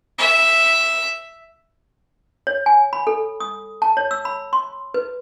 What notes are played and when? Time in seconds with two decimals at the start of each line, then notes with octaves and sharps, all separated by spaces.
0.19 E5
2.47 C#5
2.66 G#5
2.93 B5
3.07 A4
3.40 D#6
3.82 A5
3.97 C#5
4.11 E6
4.25 B5
4.53 C6
4.94 B4